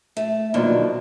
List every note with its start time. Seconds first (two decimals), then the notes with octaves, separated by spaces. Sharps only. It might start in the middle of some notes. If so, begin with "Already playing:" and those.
0.17 A3
0.54 B2 D3 D#3 F3 F#3 A#3